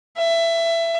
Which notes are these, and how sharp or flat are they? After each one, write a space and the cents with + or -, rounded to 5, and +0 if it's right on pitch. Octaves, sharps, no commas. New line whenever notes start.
E5 +20